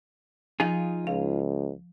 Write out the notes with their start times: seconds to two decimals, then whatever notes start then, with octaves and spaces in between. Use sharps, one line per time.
0.60 F3 D#4 F4 G#4
1.07 C#2 F5